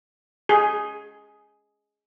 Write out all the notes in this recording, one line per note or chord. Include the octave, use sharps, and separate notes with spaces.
G#4